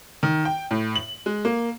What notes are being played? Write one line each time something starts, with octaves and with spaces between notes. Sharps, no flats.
D#3
G5
A2
F#7
G#3
A#3